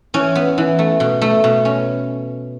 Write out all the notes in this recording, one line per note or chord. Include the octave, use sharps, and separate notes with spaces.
E3 C#4
B3
E3
A3
B2
A3
B2
C#4